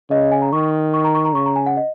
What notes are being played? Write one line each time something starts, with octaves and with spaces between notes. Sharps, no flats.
C#3 D#5
D#5
G#5
A#5
D#3 C#6
C#6
A#5
C#6
A#5
C#3 C#6
A#5
G#5
F#5
D#5